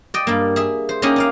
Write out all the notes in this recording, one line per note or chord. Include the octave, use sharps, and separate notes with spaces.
D5 D#5 G5
G2 A#3
G#4 E5
C5
A#3 C#4 D#4 G4 G#4 A#4
D#4 D5 F5